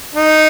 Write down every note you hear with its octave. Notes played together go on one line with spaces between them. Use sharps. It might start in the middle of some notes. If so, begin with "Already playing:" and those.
D#4